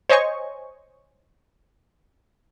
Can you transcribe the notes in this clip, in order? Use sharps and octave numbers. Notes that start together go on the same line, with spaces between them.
C5 C#5 D#5 G#5 C#6